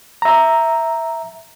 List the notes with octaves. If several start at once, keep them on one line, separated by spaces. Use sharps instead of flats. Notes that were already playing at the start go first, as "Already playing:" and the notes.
E5 A#5